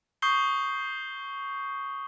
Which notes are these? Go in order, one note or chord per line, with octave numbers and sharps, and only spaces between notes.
C#6 D#6 G6 C7 G7